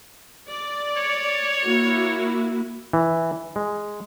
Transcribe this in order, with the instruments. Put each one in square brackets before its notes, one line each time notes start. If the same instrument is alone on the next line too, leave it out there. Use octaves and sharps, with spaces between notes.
[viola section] D5
[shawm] C#5
[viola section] A#3 E4 F#4
[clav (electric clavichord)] E3
G#3